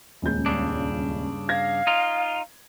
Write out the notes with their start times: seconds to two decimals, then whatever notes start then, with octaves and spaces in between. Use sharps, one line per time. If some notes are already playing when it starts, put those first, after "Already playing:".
0.22 D#1 C#2 G6
0.46 G2 C#3 D4
1.49 F5 G#6 A#6
1.87 D#4 F4